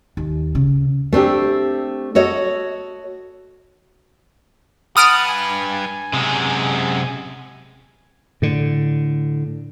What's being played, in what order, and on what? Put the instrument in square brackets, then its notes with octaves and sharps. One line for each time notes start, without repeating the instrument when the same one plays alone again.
[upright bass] D#2
C#3
[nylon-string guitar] A3 C4 D4 G4
F#4 A4 C#5 D#5
[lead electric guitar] G2 B4 [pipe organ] F#5 A5 [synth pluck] D#6 F6 D7
[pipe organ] G#5
[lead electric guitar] F#2 G#3 [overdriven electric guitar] C3
[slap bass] A2 D3